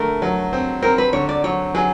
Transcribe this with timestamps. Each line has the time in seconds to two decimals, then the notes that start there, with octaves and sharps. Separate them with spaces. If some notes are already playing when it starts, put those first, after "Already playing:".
Already playing: D3 A3 A#4
0.22 F#3
0.53 C4
0.82 C4 A#4
0.98 B4
1.13 D3 C#5
1.29 D5
1.44 F#3 C#5
1.75 F#3 G#4